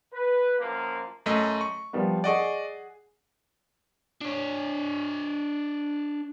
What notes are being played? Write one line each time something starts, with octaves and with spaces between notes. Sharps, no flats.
B4
F#2 F3 A#3
F#2 A3 D#5
C#6
F3 G3 B3
G#4 D5 D#5 F#5 C#6
D4 C#5